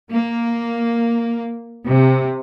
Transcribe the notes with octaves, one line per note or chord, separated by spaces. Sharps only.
A#3
C3